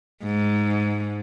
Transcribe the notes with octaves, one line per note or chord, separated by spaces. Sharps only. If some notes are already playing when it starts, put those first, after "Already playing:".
G#2